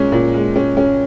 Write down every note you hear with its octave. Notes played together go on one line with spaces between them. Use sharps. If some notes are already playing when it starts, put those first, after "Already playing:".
Already playing: A#2 G#3 C#4
A#2
G#3
C#4
C#4